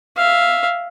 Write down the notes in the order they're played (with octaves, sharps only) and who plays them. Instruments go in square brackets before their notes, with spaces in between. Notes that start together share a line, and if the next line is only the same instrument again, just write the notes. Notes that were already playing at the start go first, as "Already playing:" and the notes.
[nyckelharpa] E5 F5